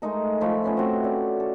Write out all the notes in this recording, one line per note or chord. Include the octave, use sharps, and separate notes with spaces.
G#3 A3 D#4 A#4
F3 A3 E4 E5
B3 C#4 B4 E5
C4 F#4
C#4 D5
A4